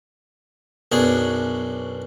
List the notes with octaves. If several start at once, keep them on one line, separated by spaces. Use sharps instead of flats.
B1 F#2 D4 G#4